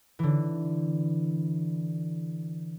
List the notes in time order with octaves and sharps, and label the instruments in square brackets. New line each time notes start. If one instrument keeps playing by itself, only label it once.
[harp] D3 E3